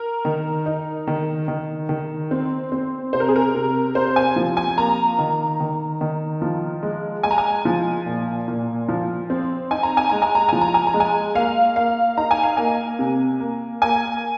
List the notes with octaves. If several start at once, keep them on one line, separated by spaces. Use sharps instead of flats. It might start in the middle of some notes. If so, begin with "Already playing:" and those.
Already playing: A#4
D#3
D#4
D#3
D#3
D#3
C4
C4
C3 C5
A#4
G#4
A#4
C3
C3 C5
G#5
F3
G#5
A#3 A#5
D#3
D#3
D#3
F3
G#3
G#3 G#5
A#5
G#5
F3
A#2
A#2
F3
C4
D#4 G#5
A#5
G#5
G#3 A#5
G#5
A#5
F3 G#5
A#5
G#5
A#5
G#3
G#5
A#3 F5
A#3 F5
D#4 A#5
G#5
F5
A#3 G#5
C3
A#3
A#3 G#5